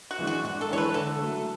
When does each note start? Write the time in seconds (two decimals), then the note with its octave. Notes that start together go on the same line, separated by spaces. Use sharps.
0.11 F#4
0.19 E3 G#3 D4
0.27 F#4
0.43 G#2 F#4
0.61 A4
0.69 E3 G#3 D4 C#5
0.78 B4
0.94 D3 A4
1.20 F#3 A3